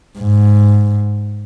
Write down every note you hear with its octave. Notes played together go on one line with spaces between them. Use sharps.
G#2